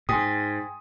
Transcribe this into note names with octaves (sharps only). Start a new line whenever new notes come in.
G#2 G5 G#5 C6 D#6